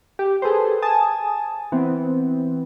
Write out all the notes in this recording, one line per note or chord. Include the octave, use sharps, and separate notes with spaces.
G4
G#4 A4 B4 C5
G#5 A5 D#6
E3 B3 C4